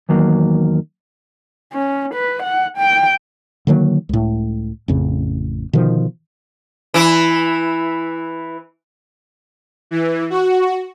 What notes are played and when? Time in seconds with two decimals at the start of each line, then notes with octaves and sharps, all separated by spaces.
0.09 E2 D#3 F#3 A#3
1.73 C#4
2.14 B4
2.43 F#5
2.78 G5
3.67 D3 D#3 F#3 A#3
4.09 C#2 A2
4.88 A1 F2 C#3
5.73 B2 D3 D#3 F3
6.94 E3 E4
9.91 E3
10.30 F#4